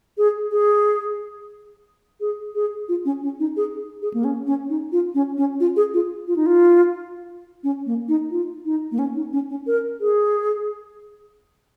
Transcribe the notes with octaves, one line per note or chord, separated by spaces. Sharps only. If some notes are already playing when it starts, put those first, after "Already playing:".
G#4
G#4
G#4
G#4
F4
C#4
C#4
D#4
G#4
G#4
A#3
C#4
C#4
D#4
F4
C#4
C#4
F4
G#4
F4
F4
D#4
F4
C#4
A#3
D#4
F4
D#4
A#3
C#4
D#4
C#4
C#4
A#4
G#4